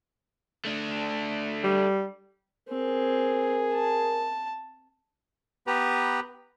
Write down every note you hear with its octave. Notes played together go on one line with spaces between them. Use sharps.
A3 D4
G3
C4 G#4 A#4
A5
B3 G4 B4 A#5